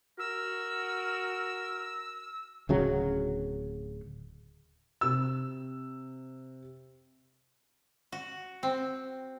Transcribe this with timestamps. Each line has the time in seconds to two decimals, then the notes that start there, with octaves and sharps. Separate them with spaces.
0.19 F#4 A#4 E6
2.69 D1 C#3 F#3
5.01 C3 E6
8.12 F#4
8.63 C4